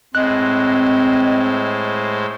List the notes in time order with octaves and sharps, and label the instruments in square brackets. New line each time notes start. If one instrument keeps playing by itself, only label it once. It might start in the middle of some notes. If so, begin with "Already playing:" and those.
[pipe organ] A2 G#3 C5 [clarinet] C4 [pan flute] D#5 [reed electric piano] F#6